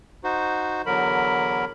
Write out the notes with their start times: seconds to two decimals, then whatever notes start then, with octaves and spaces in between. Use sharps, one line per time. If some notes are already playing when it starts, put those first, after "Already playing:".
0.24 D#4 F#4 C5
0.86 E2 D3 F#3 A#4 B5